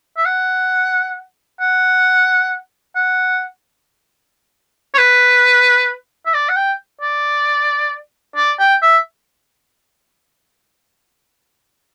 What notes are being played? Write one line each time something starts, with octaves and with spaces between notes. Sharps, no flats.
E5
F#5
F#5
F#5
C#5
B4
E5
D5
F#5
G5
D5
D5
G5
E5